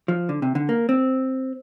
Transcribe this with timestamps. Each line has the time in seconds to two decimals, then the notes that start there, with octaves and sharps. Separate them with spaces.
0.08 F3
0.29 D3
0.42 C3
0.55 D3
0.69 A#3
0.89 C4